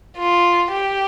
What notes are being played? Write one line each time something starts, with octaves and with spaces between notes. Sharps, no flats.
F4
G4